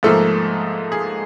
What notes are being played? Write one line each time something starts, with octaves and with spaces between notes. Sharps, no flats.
G#2 F3 A3 A#3 A4
G#4